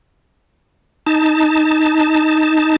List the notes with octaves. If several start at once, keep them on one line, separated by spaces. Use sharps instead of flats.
D#4 A5